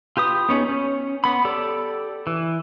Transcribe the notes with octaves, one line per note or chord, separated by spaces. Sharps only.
F4 G4 B4 D#6
B3 C#4 D#4 G#4
C#4
B3 B5
G4 A4 D5
E3